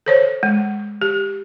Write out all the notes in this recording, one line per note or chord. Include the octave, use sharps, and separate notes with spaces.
A4 C5 C#5
G#3
G4